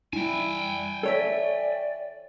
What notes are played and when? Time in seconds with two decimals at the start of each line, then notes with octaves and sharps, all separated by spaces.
0.13 G3 E4 G5 G#5
1.03 A4 C#5 D5 E5